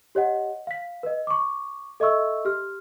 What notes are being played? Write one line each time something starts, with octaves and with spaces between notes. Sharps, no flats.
G4 C#5 D#5 F#5
F5 B6
B4 D#5
C#6 D6
A4 D#5 E5 C#6 E6
G4 F6